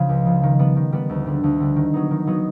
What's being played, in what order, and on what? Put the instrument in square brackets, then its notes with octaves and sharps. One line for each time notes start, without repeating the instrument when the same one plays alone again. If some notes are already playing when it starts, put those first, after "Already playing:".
Already playing: [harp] C#3 F3
C#2
C#3 F3
D#3
G3 B3
D#3
G3 B3
D2
D3 G3
D2
D3 G3
D#3
F#3 B3 D#4
D#3
F#3 B3 D#4